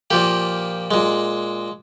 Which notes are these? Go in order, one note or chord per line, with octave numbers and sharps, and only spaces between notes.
A#2 F3 A#3 G4
A#2 G#3